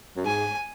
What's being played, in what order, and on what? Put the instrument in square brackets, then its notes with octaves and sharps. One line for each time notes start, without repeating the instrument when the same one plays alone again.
[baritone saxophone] F#2
[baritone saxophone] G#2 [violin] G#5